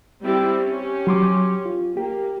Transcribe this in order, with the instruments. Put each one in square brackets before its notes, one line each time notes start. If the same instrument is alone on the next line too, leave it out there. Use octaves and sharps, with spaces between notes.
[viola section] G3 C4 E4
C#4 G4
[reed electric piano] F#3 C6 D6
F4
[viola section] A#3 [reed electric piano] G4